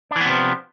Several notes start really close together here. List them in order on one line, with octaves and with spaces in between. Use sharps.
D4 E3 B3 C3 F3